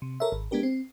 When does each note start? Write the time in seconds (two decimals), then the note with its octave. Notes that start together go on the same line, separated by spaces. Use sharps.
0.02 C3
0.20 A4 A#4 C#5 E5
0.32 G#1
0.51 G#3 B3 D4 G4 A#4
0.63 C4